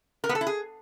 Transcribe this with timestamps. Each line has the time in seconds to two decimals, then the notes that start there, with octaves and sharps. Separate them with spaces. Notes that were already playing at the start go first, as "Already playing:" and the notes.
0.24 A#4
0.29 B3
0.35 A4
0.41 E4
0.47 G#4